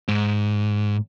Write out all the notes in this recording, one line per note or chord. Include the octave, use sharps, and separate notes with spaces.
G#2